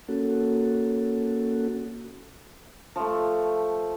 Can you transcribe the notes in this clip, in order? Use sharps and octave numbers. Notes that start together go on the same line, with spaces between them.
A#3 C#4 F#4 A4
F3 A3